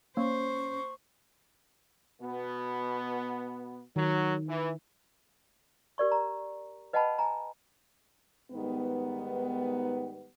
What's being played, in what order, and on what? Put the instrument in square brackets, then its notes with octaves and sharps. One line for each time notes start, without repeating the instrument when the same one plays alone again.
[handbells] A#3 [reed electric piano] C#4 [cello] C5 [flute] C#6
[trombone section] B2 B3
[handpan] D#3 [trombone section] F#3
[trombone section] E3
[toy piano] G4 A#4 D5 C#6
A#5
B4 D#5 F#5 G5 A5 B5
G#5 A#5
[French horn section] G#2 D#3 G3 B3